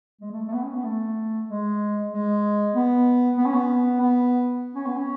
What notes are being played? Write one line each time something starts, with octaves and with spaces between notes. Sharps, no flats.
G#3
A3
A3
B3
C#4
B3
A3
G#3
G#3
B3
B3
C#4
B3
B3
C#4
B3
C#4